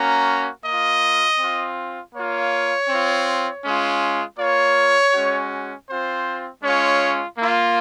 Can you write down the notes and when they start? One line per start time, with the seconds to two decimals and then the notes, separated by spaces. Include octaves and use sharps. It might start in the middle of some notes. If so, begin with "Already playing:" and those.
Already playing: A#3 C#4 F#4 A#5
0.64 A#3 F4 D#5
1.38 C4 F4
2.14 A#3 F4 C#5
2.88 C4 F4
3.64 G#3 C#4 F4
4.38 A#3 F4 C#5
5.13 G#3 C#4 F#4
5.88 C4 F4 C5
6.63 G#3 C#4 F4 C#5
7.38 A#3 F4